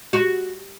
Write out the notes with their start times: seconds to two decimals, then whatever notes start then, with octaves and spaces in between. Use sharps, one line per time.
0.13 F#4